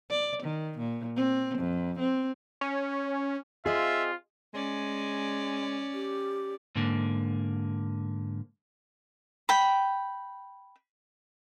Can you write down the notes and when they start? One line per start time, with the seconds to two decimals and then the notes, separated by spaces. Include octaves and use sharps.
0.10 D5
0.43 D#3
0.78 A#2
1.16 C4
1.58 F2
1.99 C4
2.61 C#4
3.66 C4 F4 G#4 D#5 E5
4.54 G#3 C#4 D5
5.94 G4
6.75 G#2 D3 A#3
9.49 G5 B5